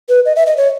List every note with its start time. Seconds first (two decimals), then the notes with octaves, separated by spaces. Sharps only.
0.09 B4
0.25 D#5
0.36 E5
0.46 D#5
0.57 C#5